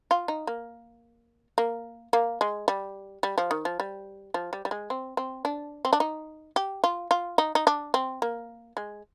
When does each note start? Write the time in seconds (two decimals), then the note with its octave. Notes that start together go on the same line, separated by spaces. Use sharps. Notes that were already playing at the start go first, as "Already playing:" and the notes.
0.11 F4
0.28 D#4
0.47 A#3
1.58 A#3
2.13 A#3
2.41 G#3
2.68 G3
3.23 G3
3.38 F3
3.51 D#3
3.65 F3
3.80 G3
4.34 F3
4.53 G3
4.65 G3
4.71 G#3
4.90 C4
5.17 C4
5.45 D4
5.85 C4
5.93 D4
6.00 D#4
6.56 G4
6.84 F4
7.11 F4
7.38 D#4
7.55 D#4
7.67 D4
7.94 C4
8.22 A#3
8.77 G#3